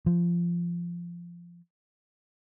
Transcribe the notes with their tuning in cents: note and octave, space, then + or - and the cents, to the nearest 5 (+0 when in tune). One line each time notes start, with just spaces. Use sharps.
F3 -15